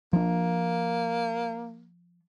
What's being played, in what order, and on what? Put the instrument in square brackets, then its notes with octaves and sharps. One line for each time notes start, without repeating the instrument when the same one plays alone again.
[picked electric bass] F3 D4 [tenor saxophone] A#3